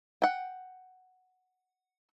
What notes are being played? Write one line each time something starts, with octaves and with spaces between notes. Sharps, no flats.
F#5 G5